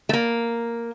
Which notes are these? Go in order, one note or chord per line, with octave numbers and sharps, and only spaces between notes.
A3
A#3